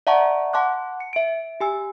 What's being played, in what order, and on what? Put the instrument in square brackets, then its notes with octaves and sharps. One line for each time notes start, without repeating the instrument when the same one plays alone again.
[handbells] D5 E5 F#5 A5 A#5 C#6
F#5 A5 C6 D6 F#6
C#7
E5 D7
G4 G#5 E6